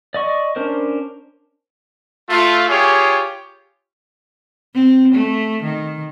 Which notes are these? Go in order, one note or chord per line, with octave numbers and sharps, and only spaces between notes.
D5 D#5 C#6
C#4 D4 A#4 C5
A3 F4
F4 G4 G#4 C#5
C4
A3
D#3